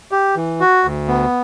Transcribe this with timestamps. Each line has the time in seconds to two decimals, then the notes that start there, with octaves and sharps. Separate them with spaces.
0.11 G4
0.36 E3
0.60 F#4
0.84 D2
1.08 B3